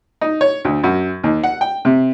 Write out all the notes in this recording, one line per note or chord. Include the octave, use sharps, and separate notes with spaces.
D#4
C#5
D2
F#2
D#2
F#5
G5
C3